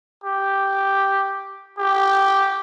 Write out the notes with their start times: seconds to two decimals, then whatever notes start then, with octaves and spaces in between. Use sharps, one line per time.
0.24 G4
1.78 G4